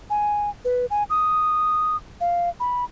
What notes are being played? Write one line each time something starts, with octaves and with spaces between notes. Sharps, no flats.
G#5
B4
G#5
D#6
F5
B5